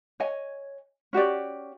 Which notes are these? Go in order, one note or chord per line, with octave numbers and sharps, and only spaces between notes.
C#5 D#5 G#5
C#4 F#4 G4 D5